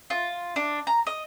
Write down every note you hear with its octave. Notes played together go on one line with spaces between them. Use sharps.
F4
D4
A#5
D#5